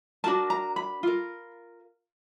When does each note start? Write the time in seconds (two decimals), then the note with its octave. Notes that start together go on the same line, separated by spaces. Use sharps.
0.24 D4 F#4 A#4 A5
0.50 A#5
0.76 B5
1.03 F4 A#4